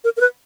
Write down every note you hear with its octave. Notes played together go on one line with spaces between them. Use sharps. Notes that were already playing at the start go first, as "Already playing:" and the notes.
A#4
A#4
B4